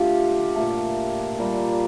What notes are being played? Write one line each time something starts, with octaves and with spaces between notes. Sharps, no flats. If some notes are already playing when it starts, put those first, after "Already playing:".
Already playing: D3 A3 F4 G4
A#2 A3
A#2 G3 A#3